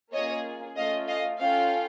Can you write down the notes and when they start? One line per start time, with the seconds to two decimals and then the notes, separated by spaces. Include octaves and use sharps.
0.12 A#3 C#4 F4 G#4 C#5 D#5
0.76 A3 C#4 F4 D#5 F5
1.08 D#5 F5
1.40 C#4 F4 A4 F5 G5